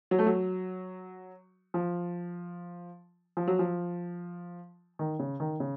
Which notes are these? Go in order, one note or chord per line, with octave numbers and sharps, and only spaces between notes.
F#3
A3
F#3
F3
F3
F#3
F3
D#3
C#3
D#3
C#3